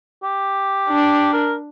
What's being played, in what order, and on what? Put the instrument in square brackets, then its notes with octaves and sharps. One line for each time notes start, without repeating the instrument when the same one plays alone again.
[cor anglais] G4
[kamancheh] D4
[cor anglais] A#4